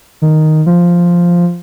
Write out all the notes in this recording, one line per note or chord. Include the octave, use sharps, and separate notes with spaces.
D#3
F3